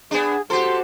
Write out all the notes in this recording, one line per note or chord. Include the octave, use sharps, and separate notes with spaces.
B3 D4 G#4
F#4 G4 A4 C5 C6